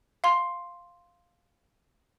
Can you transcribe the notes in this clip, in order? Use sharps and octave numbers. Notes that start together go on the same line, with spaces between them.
F5 C6